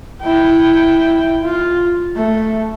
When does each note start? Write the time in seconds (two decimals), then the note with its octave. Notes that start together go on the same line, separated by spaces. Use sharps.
0.22 E4 G5
1.44 F4
2.16 A3